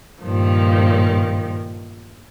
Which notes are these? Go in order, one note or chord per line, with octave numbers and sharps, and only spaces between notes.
G2 A#2 D#3 F3